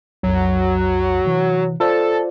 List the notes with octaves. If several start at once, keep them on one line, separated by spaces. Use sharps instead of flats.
B1 F2 F#3
C3 E3
F4 A4 C5 D5